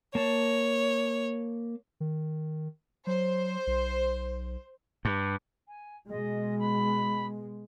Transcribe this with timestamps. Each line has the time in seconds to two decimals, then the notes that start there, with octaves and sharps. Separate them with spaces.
0.15 A#3 C#5 A5
2.00 D#3
3.07 F#3 C5
3.67 B1
5.05 G2
5.68 G#5
6.09 B2 G#3 D#5
6.59 B5